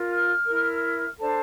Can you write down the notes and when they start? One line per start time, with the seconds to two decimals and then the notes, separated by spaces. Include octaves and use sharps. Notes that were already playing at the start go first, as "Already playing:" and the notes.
Already playing: F4 A#4
0.11 F6
0.47 E4 A#4
1.19 D4 A4 C5 A5